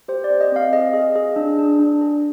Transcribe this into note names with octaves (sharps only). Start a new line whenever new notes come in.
G4 C5
D5
C4
D#5
C4 F5
G#4 D#5
G#4
G#4
D4
D4
D4
G#4